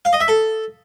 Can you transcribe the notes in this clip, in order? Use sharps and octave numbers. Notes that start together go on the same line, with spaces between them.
F5
D#5
E5
A4